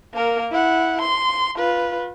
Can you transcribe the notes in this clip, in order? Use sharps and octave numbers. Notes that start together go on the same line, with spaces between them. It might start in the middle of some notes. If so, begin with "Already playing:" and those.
A#3 A#4
E4 F#5
C6
F4 B4